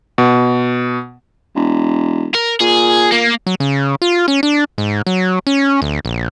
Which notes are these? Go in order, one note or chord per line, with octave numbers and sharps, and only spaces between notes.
B2
E1
A#4
A#2 G#4
A#3
F#3
C#3
F4
C#4
D4
G#2
F#3
C#4
D2
A#1